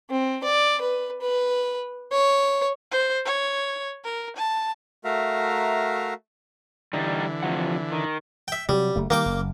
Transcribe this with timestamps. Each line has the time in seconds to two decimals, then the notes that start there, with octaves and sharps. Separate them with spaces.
0.10 C4
0.44 D5
0.81 B4
1.21 B4
2.12 C#5
2.91 C5
3.25 C#5
4.05 A#4
4.37 A5
5.04 A3 F#4 A#4 E5 F5 A#5
6.93 D3 E3 G3 D#4
7.43 C3 F3 F#5
7.92 D#3
8.48 E5 G5
8.69 C3 F#3 G3
8.96 F#1 A3
9.10 D#3 G3 A#3 G5 D6
9.26 F#1